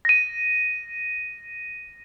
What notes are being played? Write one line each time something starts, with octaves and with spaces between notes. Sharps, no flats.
A#6 D#7